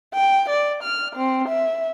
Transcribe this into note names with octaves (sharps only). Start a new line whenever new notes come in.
G5
D5
F6
C4
E5